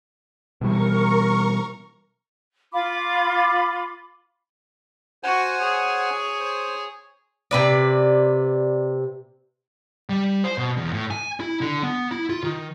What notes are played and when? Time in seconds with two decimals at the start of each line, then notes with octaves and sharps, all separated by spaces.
0.61 B2 E3 G3 A#4 C#6
2.72 F4 B5 D6
5.23 F#4 C5 F#5 G#5 C#6
5.59 G#4 C#5
6.40 C5
7.51 C3 B4 D5
10.09 G3
10.44 C5
10.58 B2
10.77 E2
10.93 A2
11.11 G#5
11.40 E4
11.61 D3
11.83 B3
12.11 E4
12.30 F4
12.43 D#3